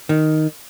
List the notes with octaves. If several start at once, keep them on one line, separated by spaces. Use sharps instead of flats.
D#3